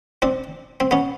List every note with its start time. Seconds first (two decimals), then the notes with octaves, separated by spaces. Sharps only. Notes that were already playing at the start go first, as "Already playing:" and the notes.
0.22 C4 D4
0.80 C4
0.91 B3 C#4